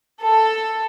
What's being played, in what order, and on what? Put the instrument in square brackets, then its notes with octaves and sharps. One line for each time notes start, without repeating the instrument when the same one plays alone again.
[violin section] A4